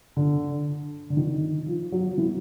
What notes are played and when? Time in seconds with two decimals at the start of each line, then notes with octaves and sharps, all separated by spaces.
0.17 D3
1.10 D3
1.17 D#3
1.66 F3
1.92 F#3
2.18 E3